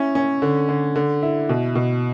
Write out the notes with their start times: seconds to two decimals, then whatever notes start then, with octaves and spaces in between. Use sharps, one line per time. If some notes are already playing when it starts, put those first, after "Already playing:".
Already playing: C#4 E4
0.15 C#4
0.42 D3
0.69 D3
0.96 D3
1.22 E4
1.49 B2
1.75 B2